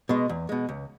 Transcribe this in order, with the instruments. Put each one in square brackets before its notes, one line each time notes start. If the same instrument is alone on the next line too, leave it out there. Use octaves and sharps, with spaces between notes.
[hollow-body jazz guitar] B2 G#3
E2
B2 G#3
C#2